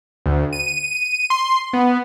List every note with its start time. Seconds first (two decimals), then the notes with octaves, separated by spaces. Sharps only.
0.26 D2
0.53 D#7
1.30 C6
1.73 B3